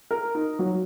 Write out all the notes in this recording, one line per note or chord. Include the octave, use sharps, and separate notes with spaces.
A#4
D#4
F#3